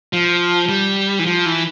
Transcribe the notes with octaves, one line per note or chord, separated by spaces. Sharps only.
F3
G3
E3
F3
E3